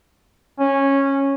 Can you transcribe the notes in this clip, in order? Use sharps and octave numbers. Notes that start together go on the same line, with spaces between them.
C#4